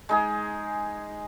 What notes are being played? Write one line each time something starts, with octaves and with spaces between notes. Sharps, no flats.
G#3 D#4 G#4